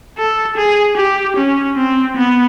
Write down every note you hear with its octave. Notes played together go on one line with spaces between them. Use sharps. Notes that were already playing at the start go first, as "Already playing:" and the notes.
A4
G#4
G4
C#4
C4
B3